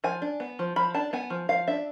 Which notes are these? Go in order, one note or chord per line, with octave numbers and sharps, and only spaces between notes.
F3 G#5
D4
B3
F3
F3 B5
D4 A5
B3 G#5
F3
F3 F5
D4 E5